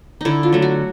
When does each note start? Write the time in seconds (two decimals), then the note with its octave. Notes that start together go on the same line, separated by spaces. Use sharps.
0.21 D3 D#4 E4
0.43 F4
0.53 F#3 A3
0.62 F#4